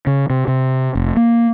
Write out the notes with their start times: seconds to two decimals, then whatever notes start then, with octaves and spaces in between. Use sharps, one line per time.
0.07 C#3
0.30 C3
0.48 C3
0.95 F1
1.17 A#3